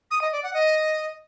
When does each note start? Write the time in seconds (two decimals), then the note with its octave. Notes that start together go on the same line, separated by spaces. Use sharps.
0.11 D#6
0.22 D#5
0.32 D5
0.43 F#5
0.54 D#5